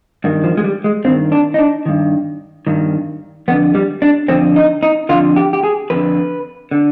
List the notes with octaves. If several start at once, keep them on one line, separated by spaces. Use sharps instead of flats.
G2 D#3
F3
G#3
G3
G#3
G2 D#3 C4
D4
D#4
D4
G2 D#3
G2 D#3
F2 D3 B3
G3
D4
F2 D3 C4
D#4
D#4
F2 D3 F4
G4
G4
G#4
F2 D3 B4
D3